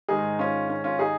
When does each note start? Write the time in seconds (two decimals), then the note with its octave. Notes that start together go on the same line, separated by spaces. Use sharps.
0.09 G#2 D#3 G#3 D#4 G#4
0.39 C#4 F4
0.69 C#4
0.84 C#4 F4
0.99 D#4 G#4